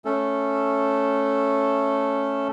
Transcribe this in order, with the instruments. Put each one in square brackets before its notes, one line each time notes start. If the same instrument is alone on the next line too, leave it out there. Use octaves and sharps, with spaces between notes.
[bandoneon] A3 C#4 A4